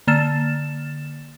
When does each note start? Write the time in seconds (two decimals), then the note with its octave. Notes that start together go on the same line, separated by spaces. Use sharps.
0.07 D3 A#3 A6 E7